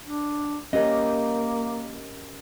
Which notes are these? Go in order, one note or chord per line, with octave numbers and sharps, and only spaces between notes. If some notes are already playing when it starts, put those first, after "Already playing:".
D4
A#3 C#4 G4 A#4 D#5